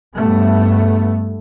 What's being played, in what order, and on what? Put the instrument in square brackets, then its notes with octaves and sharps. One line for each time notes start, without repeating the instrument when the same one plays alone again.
[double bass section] G2 A3 B3